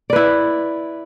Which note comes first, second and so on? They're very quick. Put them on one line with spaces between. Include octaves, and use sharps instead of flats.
D5 B4 E4